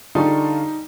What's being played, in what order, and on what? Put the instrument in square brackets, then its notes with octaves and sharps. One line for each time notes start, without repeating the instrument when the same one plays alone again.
[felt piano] D3 [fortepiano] G3 G4 G#4 [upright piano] D#4 [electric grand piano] F4 A5 C#6